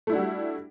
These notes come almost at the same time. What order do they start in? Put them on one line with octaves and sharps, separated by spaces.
A3 E4 D4 F#4 G3